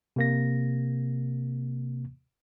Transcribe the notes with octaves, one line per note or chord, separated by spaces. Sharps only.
C3 A#3 A#6